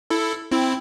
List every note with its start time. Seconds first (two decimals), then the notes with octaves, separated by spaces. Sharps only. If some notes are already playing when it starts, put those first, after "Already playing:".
0.10 E4 A4
0.51 C4 E4